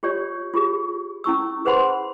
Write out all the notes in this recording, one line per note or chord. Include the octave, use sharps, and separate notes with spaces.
F4 G4 C#5 D5
F4 G4 G#4
C#4 E4 C#6 E6
G#4 B4 C5 F#5 B5 C6